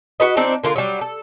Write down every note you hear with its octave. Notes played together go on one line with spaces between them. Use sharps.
F#4 B4 D#5
F3 C4 D4 D#4
D3 A#3 F4
F#3 G3
A4